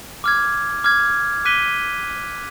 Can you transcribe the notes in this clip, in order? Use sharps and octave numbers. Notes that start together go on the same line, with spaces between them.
D6 F6 G#6
D6 F6 G#6
D6 F#6 B6 D#7 G7